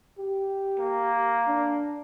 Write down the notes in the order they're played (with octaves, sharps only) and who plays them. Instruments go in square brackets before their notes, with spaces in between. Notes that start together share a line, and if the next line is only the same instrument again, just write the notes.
[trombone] G4
[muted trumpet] A#3
[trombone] D4